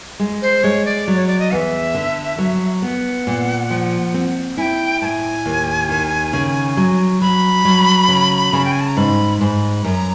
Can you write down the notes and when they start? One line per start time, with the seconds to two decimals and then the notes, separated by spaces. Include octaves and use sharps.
0.20 G#3
0.42 C5
0.63 G#3 C#5
0.85 D5
1.08 F#3
1.16 C#5
1.27 D5
1.39 D#5
1.51 E2 E5 F#5
1.94 D3
2.38 F#3
2.82 B3 F#5
3.27 A#2
3.70 F3
4.14 C4
4.57 E4 G#5
4.62 G5
5.02 A2 A5
5.05 G#5
5.46 D#2
5.89 D#3
6.33 C#3
6.77 F#3
7.21 F#3 B5
7.65 F#3
8.08 C#3
8.53 C#3
8.65 G5
8.72 G#5
8.81 A5
8.88 A#5
8.97 G#2 B5
9.41 G#2 B5 C6
9.84 F#2 A#5